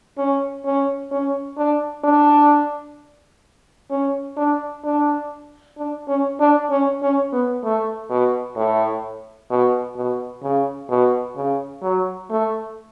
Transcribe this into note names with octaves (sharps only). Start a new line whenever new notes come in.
C#4
C#4
C#4
D4
D4
C#4
D4
D4
D4
C#4
D4
C#4
C#4
B3
A3
B2
A2
B2
B2
C#3
B2
C#3
F#3
A3